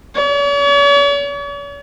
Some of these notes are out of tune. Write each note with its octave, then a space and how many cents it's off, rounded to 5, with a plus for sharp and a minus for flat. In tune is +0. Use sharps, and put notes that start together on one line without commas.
C#5 +45